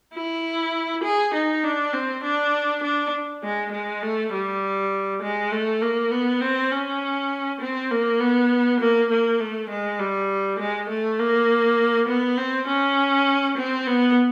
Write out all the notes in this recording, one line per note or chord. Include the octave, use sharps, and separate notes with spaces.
E4
G#4
D#4
D4
C4
D4
D4
G#3
G#3
A3
G3
G#3
A3
A#3
B3
C4
C#4
C4
A#3
B3
A#3
A#3
A3
G#3
G3
G#3
A3
A#3
B3
C4
C#4
C4
B3